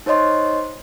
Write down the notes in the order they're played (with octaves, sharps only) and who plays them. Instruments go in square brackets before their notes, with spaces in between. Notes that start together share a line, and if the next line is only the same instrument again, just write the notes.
[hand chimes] D#4 C5 C#5 D#5 C6